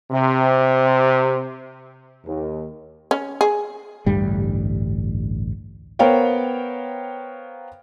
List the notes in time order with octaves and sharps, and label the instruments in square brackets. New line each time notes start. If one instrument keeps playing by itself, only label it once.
[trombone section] C3
D#2
[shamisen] C#4
G#4
[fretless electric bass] A1 D2 G2 G3
[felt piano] B3 A#4 C5 C#5 F5 G5